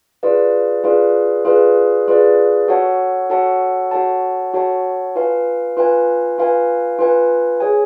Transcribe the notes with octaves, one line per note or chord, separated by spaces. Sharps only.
F4 G#4 B4 D5 F5
F4 G#4 B4 D5 F5
F4 G#4 B4 D5 F5
F4 G#4 B4 D5 F5
F#4 A4 C#5 F#5 A5
F#4 A4 C#5 F#5 A5
F#4 A4 C#5 F#5 A5
F#4 A4 C#5 F#5 A5
F4 B4 F5 G#5
F4 B4 F5 G#5
F4 B4 F5 G#5
F4 B4 F5 G#5
G#4 C#5 G#5